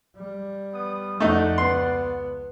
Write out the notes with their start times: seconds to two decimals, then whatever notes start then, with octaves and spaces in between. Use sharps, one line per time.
0.17 G3
0.74 B3 D#6
1.20 F2 A3 D#4 D5 F#5
1.58 C#2 B3 C6